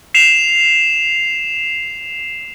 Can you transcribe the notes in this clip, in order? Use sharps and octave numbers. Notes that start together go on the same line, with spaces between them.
C7 E7 F7